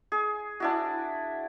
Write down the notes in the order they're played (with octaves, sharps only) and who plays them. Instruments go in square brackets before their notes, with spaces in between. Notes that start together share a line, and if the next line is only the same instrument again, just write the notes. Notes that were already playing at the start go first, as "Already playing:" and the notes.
[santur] G#4
D4 E4 F#4